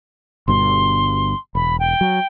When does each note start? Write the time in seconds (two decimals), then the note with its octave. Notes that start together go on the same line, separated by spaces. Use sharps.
0.48 G1 G2 B2 C6
1.55 E1 B5
1.80 G5
2.01 F#3